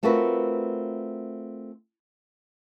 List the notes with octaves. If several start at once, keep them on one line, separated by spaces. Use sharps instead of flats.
A3 C4 F4 F#4 A#4 B4